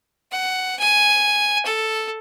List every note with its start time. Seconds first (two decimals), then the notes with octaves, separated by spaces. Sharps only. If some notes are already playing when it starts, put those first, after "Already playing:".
0.32 F#5
0.79 G#5
1.65 A4